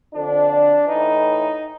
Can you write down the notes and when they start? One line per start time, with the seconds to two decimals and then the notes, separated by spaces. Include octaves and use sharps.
0.13 F2 D3 F3 D4
0.87 A2 E3 D#4